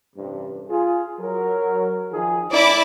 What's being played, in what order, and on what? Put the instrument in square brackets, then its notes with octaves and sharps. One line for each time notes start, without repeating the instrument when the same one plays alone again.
[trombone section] A1 G2 C3
F4 G#4
F#3 A#4
D#3 F3 G#4
[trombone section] A2 [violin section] E4 D5 D6